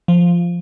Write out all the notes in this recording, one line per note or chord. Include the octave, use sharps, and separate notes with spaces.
F3